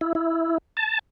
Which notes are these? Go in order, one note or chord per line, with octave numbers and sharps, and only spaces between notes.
E4
E4
A5